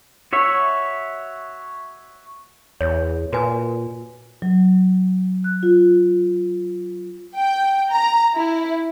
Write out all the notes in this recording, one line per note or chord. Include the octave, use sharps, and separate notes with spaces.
F#4 C#5 E5
E2 C#5
A#2 F#4 B4 G#5
F#3
F#6
F4
G5
A#5
E4